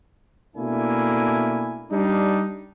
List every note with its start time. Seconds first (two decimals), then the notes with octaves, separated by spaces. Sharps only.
0.56 B2 A3 A#3 D4 E4 G#5
1.91 G3 D4 D#4